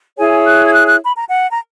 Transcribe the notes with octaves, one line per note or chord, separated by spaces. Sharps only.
E4 G#4 C#5 G#5
F#6
G#6
F#6
F#6
B5
A#5
F#5
A#5